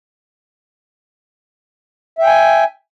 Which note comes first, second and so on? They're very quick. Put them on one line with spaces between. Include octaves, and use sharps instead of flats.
E5 G5 G#5